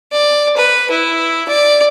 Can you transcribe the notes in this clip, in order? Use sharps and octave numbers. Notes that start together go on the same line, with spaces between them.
D5
B4
E4
D5